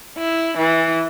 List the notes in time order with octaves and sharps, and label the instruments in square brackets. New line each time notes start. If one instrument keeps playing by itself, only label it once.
[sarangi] E4
E3